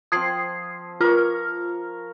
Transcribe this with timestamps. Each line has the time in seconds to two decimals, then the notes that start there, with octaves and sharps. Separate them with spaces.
0.12 F3 C4 D#6 G#6 C7
1.01 F4 A#4 C#5 F6